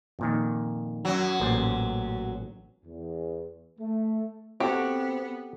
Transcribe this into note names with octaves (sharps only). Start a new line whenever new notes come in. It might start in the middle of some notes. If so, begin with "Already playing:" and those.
F2 A#2 D#3
F#2 F#3
A1 A#2 C5
E2
A3
B3 C4 F#4 G4 A4